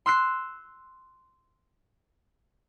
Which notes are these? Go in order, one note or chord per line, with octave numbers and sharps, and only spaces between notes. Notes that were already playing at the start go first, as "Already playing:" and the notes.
C6 E6 F#6 C7